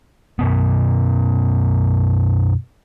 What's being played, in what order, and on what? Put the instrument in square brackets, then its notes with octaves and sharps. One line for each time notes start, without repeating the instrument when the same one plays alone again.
[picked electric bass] F#2 B2 B3